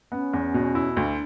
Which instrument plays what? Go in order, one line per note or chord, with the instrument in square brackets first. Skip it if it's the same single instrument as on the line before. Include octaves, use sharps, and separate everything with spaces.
[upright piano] B3 [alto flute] C#4
[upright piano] E2
B2
E4
[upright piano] D2 [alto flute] D4